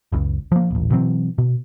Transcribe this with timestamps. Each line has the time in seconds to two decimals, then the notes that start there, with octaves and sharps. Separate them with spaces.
0.12 F#1 C#2
0.52 F3 A#3
0.70 D#1 A1
0.91 B2 E3 F#3 C4
1.38 B2